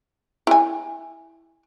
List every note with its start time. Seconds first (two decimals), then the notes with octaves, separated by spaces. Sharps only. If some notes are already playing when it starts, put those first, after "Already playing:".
0.47 E4 G#5